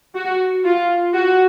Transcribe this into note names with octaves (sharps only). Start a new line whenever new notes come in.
F#4
F4
F#4